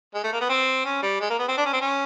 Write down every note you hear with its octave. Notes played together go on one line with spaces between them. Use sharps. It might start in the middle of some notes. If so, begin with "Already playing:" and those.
G#3
A3
A#3
B3
C4
C#4
G3
G#3
A#3
B3
C4
D4
C#4
C4
C#4